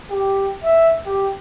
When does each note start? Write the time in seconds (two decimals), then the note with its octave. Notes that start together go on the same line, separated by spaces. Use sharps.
0.10 G4
0.63 E5
1.06 G4